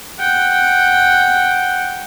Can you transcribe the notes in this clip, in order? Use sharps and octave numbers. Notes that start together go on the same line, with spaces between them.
F#5 G5